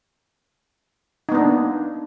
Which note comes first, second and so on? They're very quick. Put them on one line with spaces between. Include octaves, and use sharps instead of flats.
D#4 B3 D4 A#3